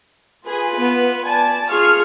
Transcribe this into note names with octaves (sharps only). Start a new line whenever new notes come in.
F4 G#4 B4
B3
D5 G#5 A5
F4 G#4 C#6 F6 C7